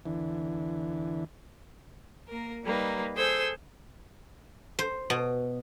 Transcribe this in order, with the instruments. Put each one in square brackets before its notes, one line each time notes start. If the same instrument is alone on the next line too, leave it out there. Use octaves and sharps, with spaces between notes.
[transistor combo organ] E2 D3 E3
[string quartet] A#3 A#4
G3 A#3 D#4 B4
G#4 A4 C5 G#5 E6 G6
[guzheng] C5
B2